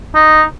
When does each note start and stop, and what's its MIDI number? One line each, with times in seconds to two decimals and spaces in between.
0.15 0.43 63